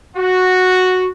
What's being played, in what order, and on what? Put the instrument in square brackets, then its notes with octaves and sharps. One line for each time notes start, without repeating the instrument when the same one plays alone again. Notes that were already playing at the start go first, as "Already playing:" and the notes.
[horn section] F#4